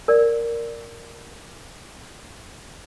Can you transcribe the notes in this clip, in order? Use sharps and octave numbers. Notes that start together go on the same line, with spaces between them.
A#4 D5